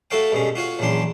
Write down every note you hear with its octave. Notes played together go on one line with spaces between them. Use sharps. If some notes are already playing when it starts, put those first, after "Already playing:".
A3 F#4 A4 C#5 F5 G5
G2 B2 G#3 C#4
F4 F#4 C#5 F5
A#1 E2 F#3 C#4 D4 C6